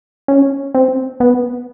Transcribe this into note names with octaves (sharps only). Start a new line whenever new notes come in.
C#4
C4
B3